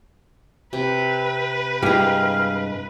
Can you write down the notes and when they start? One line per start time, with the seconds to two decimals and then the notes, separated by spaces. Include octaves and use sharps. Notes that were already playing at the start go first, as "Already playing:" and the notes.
0.73 C3 B4
1.82 G2 G#3 E4 G4 F5 A#5